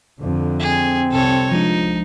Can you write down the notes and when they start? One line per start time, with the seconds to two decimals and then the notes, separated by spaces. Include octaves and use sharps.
0.19 F2 D3
0.60 C4 G#4
1.11 C2 A4 C#5
1.52 F3 G#3 D4 D#4